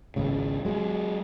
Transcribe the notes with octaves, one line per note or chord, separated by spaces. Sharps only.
G#1 C#2 C#3
F#3 G#3